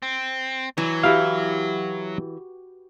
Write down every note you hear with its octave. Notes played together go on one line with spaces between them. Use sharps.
C4
E3 F#3
E4 F#4 G4 F5